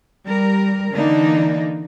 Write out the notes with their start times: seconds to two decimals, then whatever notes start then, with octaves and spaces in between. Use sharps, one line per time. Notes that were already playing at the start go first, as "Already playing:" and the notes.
0.24 G3 A#4
0.92 D3 E3 A#3 D4 D#4